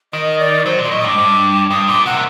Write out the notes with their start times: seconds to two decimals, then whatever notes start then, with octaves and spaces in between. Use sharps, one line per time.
0.13 D#3 D#5
0.39 D5
0.65 F#3 C5
0.79 A#2 D#5
0.91 A2
1.01 D#6
1.04 G2 D6
1.18 G2
1.71 G2 D#6
1.88 A#2 D6
2.06 C3 F#5
2.14 D#3